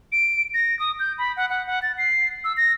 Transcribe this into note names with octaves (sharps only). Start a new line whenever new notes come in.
D7
A#6
D#6
G6
B5
F#5
F#5
F#5
A6
C7
E6
A#6